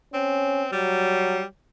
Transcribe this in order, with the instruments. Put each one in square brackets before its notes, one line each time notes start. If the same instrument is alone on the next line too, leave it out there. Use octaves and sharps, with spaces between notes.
[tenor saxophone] C4 [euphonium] C#4
[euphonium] F#3 [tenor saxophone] G3